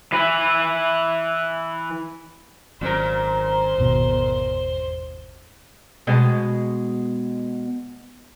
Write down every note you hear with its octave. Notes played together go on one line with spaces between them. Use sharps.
E3 B4
G#1 A#2 F#3 C#4 A#4 C5
G#1 E2 B2
B2 G#3